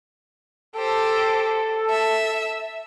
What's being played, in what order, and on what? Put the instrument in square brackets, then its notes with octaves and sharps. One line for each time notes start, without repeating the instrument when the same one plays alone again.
[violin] G4 C5 [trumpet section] A4
[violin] E5